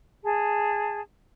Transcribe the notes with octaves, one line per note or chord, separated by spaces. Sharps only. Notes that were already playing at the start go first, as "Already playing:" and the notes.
G#4 A5